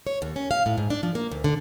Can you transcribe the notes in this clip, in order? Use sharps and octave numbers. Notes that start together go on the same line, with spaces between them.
C#5
D#2
C#4
F5
A2
G#2
D4
F3
A#3
D2
D3